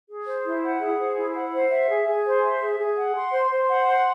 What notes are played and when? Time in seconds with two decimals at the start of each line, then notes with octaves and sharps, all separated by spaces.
0.08 G#4
0.26 C5
0.45 E4
0.63 F#5
0.81 G#4
0.98 C5
1.16 E4
1.35 F#5
1.53 C5
1.71 E5
1.88 G#4
2.07 G#4
2.24 C5
2.43 E5
2.61 G#4
2.79 G#4
2.97 F#5
3.14 C6
3.33 C5
3.51 C5
3.69 F#5
3.86 C6